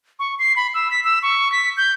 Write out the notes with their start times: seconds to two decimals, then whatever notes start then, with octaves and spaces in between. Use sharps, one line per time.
0.19 C#6
0.39 C7
0.56 B5
0.74 E6
0.91 B6
1.05 E6
1.22 C#6
1.52 B6
1.77 G6